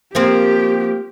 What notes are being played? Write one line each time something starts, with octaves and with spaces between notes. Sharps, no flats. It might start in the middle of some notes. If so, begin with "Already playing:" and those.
F3 A#3 C4 G4